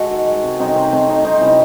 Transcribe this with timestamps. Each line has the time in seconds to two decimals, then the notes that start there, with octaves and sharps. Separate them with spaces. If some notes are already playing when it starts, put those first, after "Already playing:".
Already playing: G#3 F#4 A4
0.11 D#3
0.27 G#3
0.43 C3
0.59 F#3 C4 D#4
0.76 C3 C4
0.92 A3 C4
1.08 C3 C4 D#4
1.24 F#3 C4 D#4
1.41 C3 C#4 E4